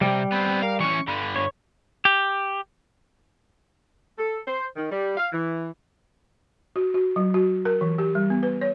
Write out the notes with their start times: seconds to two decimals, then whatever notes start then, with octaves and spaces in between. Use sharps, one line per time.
0.01 C3 G3 G5
0.32 B3 C4 B5
0.63 A#4 F5
0.80 E3 C#4 C#6
1.08 G2 D3 B5
1.36 C#5
2.05 G4
4.18 A4
4.47 C5
4.76 D#3
4.91 G3
5.17 F5
5.33 E3
6.76 F#4
6.94 F#4
7.16 F#3
7.34 F#4
7.65 A#4
7.81 E3
7.98 G4
8.15 G3
8.30 B3
8.43 B4
8.61 C#5